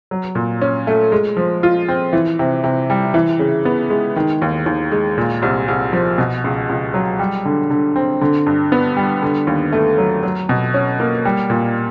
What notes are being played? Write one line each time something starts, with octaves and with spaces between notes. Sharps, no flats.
F#3
A#2
C#4
A3
G#3
F3
F4
C4
E3
C3
C3
G3
E3
C#3
B3
G#3
D#3
D#2
D#2
G#3
A#2
C2
C2
F3
B2
C#2
C#2
F#3
G3
D3
D3
C4
D3
G2
B3
G3
D3
D#2
A3
F#3
F#3
B2
C#4
A#3
G3
A#2